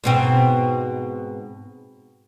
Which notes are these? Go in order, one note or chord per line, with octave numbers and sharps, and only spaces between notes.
G#2 B2 C4